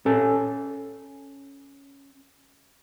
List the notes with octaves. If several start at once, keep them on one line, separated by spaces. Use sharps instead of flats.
C#4 A4 G#5